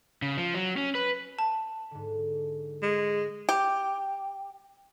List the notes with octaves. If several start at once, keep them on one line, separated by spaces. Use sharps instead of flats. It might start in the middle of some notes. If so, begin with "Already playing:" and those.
C#3
F3
F#3
C#4
B4
A5
G#2 D3
G#3
G4